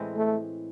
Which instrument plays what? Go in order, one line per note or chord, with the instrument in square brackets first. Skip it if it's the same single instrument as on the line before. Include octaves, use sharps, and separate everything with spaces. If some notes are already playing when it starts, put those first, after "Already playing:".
Already playing: [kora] A2 E3 G#3 C4
[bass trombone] A3